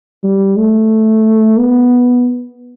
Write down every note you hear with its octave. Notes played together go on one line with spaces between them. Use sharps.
G3
A3
B3